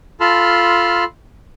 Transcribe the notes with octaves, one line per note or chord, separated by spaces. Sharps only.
F4 A4 A5 B5 C6 F6